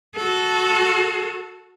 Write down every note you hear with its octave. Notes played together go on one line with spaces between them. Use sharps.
F#4 A4